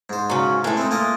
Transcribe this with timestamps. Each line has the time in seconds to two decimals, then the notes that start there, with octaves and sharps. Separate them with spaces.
0.10 G#2 C5
0.30 C#3 F#3
0.64 A2 G#3 A3
0.77 C4 D#4
0.91 A#3 F4 D#5